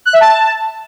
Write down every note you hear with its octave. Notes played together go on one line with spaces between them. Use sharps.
F#6
E5
A5